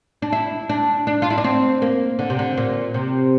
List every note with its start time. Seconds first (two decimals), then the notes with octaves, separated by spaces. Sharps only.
0.22 D4
0.32 E4
0.69 D4
1.07 D4
1.22 F4
1.30 E4
1.38 D4
1.44 C4
1.82 A#3
2.19 D3
2.30 C3
2.39 D3
2.57 A#2
2.94 C3